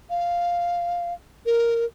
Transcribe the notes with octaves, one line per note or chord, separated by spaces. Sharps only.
F5
A#4